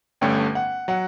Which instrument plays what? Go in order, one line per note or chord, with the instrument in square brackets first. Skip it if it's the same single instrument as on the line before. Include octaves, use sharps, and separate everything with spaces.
[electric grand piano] G1 G2 D3 A3 C#4 [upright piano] G5
[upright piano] F#5
[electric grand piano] F#3 [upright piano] F#5